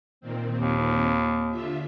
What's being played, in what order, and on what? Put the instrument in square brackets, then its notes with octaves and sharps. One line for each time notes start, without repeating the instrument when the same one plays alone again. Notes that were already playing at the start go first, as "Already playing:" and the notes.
[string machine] A#2 D#3 C4
[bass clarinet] D#2
[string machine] D3 F4 E5